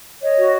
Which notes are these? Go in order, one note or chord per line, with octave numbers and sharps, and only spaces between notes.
C#5 D#5
F#4